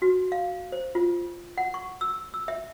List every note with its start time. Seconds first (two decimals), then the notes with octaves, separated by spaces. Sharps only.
0.02 F#4
0.32 F5
0.72 C5
0.95 F4
1.58 F#5
1.74 C#6
2.01 E6
2.34 E6
2.48 E5